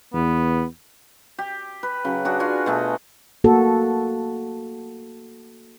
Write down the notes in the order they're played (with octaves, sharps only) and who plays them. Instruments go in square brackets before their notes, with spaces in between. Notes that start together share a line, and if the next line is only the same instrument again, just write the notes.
[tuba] E2 [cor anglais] B3
[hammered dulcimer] G4
B4
C#3 F#3
D4 F#4 G#4
D4 F4 F#4 G#5
B2 A3 G#4
[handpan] A#3 F#4 A4